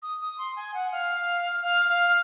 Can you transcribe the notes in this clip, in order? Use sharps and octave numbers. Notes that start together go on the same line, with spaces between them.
D#6
D#6
C6
G#5
F#5
F5
F5
F5